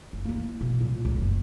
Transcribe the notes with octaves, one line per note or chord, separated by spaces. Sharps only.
F#1
A#3 E4
B2
A#2 G3
C#2 D3
F#1